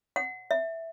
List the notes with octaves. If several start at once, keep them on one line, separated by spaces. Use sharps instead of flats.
F#5
E5